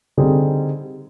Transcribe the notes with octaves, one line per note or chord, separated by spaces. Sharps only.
D3 G3 C4 D#4 G#4